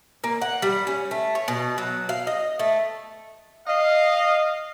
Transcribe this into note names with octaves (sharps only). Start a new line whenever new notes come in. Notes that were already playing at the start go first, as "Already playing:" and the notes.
A#3
F#5
G3
C#4
A3
C#5
B2
F#3
F5
D#5
A3
D#5 F5